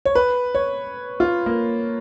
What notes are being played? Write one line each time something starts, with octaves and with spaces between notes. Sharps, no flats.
C#5
B4
C#5
F4
A#3